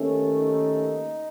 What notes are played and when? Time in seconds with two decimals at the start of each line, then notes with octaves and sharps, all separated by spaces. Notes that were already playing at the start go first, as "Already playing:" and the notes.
Already playing: D#2 D#3 A3 C#4
0.37 D#4